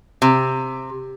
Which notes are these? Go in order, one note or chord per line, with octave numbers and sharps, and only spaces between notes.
C3